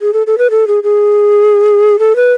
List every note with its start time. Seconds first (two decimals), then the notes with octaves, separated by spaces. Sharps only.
0.01 G#4
0.13 A4
0.27 A4
0.38 B4
0.51 A4
0.67 G#4
0.83 G#4
1.99 A4
2.16 B4